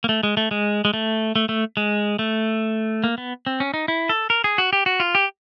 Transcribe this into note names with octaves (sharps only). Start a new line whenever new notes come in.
A#3
A3
G#3
A3
G#3
G#3
A3
A3
A3
G#3
A3
A#3
B3
C4
C#4
D#4
E4
A4
A#4
G#4
F#4
G4
F#4
F4
G4